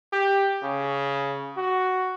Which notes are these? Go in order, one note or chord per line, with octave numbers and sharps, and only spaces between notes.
G4
C#3
F#4